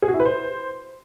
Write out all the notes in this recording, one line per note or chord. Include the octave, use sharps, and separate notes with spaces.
G#4
F#4
E4
B4
C5